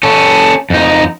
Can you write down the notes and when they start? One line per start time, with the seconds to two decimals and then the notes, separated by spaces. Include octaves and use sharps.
0.03 C#4 A4
0.70 F2 D#4